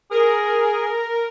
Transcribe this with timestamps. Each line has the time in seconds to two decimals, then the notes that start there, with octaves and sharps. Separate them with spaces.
0.11 G#4 A#4